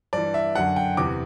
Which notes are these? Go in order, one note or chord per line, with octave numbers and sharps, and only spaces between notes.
G2 E3 D5
E5
F#2 D3 F#5
G5
E2 C3 E3 D6